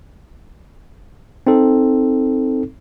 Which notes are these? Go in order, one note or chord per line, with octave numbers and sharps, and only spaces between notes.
C4 D#4 A4